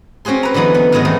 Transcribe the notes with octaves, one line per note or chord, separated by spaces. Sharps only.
C4 C#4 F#4 G#4 C6
B4 A#5
D3 E3 F#3 B3 D#4
B3
G#2 D#3 F#3 B3 G#4 D#5
E2 A3 C4 D#4